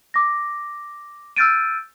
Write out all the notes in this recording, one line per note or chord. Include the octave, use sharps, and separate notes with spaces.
D6 A#6
E6 F6 G6 A6 D7 D#7